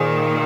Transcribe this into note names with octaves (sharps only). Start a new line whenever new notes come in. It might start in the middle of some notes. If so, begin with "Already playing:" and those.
Already playing: A#2 D#3 G#4 C5 G#5